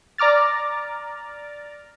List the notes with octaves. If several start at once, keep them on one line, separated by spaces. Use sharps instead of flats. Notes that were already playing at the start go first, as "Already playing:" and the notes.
D5 A#5 D6 F6 A6